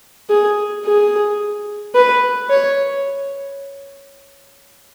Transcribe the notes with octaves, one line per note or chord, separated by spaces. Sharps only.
G#4
G#4
B4
C#5